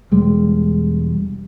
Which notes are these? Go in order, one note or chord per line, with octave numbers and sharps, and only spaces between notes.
E1 G3 G#3